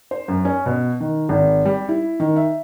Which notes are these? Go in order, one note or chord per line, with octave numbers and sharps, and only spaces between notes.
C5
F#2
C#4
B2
D#3
G#1
G3
E4
D#3
E5